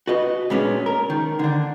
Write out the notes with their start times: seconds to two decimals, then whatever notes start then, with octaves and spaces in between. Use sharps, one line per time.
0.07 F#4 B4 D#5
0.50 A#2 G#3 B3 C#4 D4
0.86 A#4
1.10 D#3
1.39 D3 D4